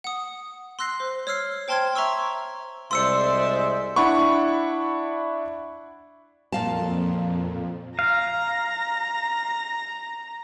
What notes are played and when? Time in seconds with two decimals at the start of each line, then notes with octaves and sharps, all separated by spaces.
0.04 F#5 D#6
0.79 C6 E6 F#6 A#6 C7
1.00 C5
1.27 C#5 E6 F6 C7
1.68 C5 G5 A5 C6 F6 G#6
1.95 E5 A#5 C6 C#6 E6
2.91 C2 G#3 C5 D5 E5 C6 E6 C#7
3.96 D4 E4 F#5 B5 C#6
6.52 F2 A#2 F5 A5
7.99 F5 A#5